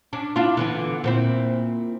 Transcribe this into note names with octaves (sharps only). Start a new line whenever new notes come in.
C#4 D4
D4 E4 F4
D3 E3 B3
A#2 C4 E4